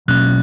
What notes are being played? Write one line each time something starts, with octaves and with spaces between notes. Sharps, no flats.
B2 F#3 A#3 C#4 F#6